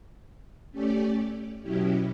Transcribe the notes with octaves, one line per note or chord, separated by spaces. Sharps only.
A3 C#4 G4 D5
B2 F#3 C#4 E4 G4